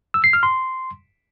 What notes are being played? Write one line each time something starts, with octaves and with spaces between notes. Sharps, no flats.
E6
C7
F6
C6